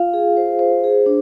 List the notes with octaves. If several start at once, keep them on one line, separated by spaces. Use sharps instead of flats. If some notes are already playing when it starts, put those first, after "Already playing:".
Already playing: F4 F5
G#4
C5
C5
G#4
D4